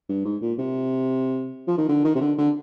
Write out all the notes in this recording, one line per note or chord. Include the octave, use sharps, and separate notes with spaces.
G2
G#2
A#2
C3
F3
D#3
D3
D#3
C3
D3
D3